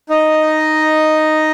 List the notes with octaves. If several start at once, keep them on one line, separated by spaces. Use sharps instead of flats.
D#4 D#5